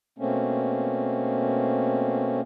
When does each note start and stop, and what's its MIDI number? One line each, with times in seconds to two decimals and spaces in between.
0.18 2.41 47
0.18 2.41 57
0.18 2.41 58
0.18 2.41 60
0.18 2.41 61